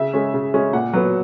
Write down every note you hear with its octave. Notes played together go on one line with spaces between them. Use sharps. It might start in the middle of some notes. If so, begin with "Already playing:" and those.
Already playing: C#3 E5
G#3 C#4
C#3
G#3 C#4
A#2 F#5
F#3 B3